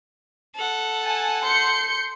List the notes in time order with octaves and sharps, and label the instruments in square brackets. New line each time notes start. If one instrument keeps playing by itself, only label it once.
[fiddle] A4 F#5
[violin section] G#5 A5
C6 G6 C#7